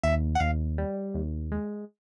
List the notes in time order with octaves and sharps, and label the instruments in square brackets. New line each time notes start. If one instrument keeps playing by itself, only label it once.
[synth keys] D#2 E5
F#5
D#2 F5
G3
D#2
G#3